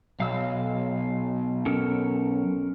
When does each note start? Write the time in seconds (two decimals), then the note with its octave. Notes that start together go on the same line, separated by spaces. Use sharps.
0.20 B1 F5 E6
1.66 C#4 A4 A#4